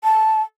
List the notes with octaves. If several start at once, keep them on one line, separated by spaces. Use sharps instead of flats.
A5